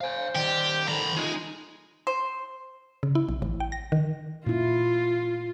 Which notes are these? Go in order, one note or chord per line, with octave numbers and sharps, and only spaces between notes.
C5 F5 G#5
D#3 G4 D5
D#3 A4 A#5 B5
G#3 D#4 F4
C5
C#3
E4
B1
A1
G5
A#6
D#3
A#2 E4 F4